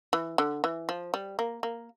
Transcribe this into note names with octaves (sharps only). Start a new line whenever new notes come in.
E3
D3
E3
F3
G3
A#3
A#3